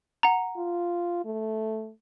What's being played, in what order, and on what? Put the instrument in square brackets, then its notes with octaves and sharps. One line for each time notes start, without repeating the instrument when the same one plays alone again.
[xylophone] F#5 A#5
[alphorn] F4
A3